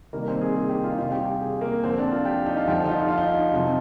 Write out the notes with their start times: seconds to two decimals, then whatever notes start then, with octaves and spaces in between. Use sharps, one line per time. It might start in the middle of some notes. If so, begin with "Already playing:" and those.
0.13 C3 D#3 G3 A#3
0.28 C4
0.41 G#4
0.56 G#4
0.69 G4
0.84 F4
0.92 D#4
0.98 C3 G3 F4
1.12 G4
1.26 G4
1.41 G#4
1.61 A#3
1.82 D3 F3 C4
1.98 D4
2.12 F4
2.25 G4
2.46 D#4
2.57 F4
2.68 F3 G4
2.72 D3
2.85 D#4
2.89 F4
3.00 D#4
3.09 F4
3.18 D#4
3.54 C3 F3